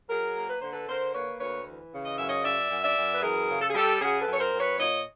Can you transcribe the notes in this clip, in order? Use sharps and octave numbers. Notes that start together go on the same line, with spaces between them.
F#3 G#4 A#4
A#3
B4
D3 C5
A4 B4
D3 A#4 C5
A#3 B4 C#5
D2 B4 C#5
E3
C#3
D#5
F#2 E5
C#5 D#5
F#2 D5 E5
F#2
D5 E5
F#2
B4
E3 G#4 A#4
C#3
A4
G#4
G3 G4 A4
C#3 F#4 G#4
A4 B4
F#2
C#5
A#4 C5
F#2
B4 C#5
A#2 C#5 D#5